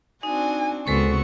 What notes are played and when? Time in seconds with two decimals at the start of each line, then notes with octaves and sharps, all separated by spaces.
0.23 C4 D4 D#4 F#4 G#5
0.87 C#2 G#3 B3 C4 F#4 A4 C5 C#6